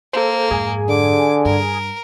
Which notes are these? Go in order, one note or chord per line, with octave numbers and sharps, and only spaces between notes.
A#3 A4 C5
F2 G#2 G#4 G#5
D3 D6
G2 A#4